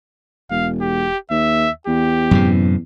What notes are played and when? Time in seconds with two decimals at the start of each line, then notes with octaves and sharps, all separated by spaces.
0.51 E1 F5
0.81 G4
1.31 D#2 E5
1.87 E2 G4
2.31 F#2 A2 C3